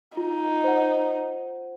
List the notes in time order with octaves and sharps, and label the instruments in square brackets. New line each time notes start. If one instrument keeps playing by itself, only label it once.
[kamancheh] D#4 [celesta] F4
[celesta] C5 F#5